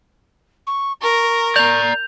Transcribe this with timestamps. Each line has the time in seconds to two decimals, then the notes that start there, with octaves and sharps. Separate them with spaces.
0.67 C#6
1.02 A#4 C#6
1.56 D5 A#5 G6 F7